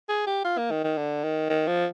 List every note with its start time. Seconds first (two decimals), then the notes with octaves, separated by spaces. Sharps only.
0.09 G#4
0.27 G4
0.45 F4
0.58 A#3
0.71 D#3
0.84 D#3
0.98 D3
1.24 D#3
1.50 D#3
1.67 F3